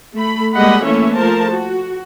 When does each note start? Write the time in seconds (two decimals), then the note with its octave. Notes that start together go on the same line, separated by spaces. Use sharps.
0.15 A3 B5
0.55 G3 G#3 A#3 D#5 F#5 B5
0.83 E3 A3 A#3 C#4 C#5 E5
1.16 F3 A3 A#4 C5 A5
1.52 F#4